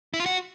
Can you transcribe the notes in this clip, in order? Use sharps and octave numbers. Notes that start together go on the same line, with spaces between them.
E4
F4
F#4